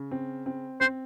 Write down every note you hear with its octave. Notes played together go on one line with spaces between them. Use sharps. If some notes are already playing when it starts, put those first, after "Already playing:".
Already playing: C#3
C4
C4
C4 C5